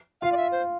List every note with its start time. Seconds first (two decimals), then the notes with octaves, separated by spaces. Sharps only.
0.21 F4 F5
0.32 D5
0.37 E5
0.52 C5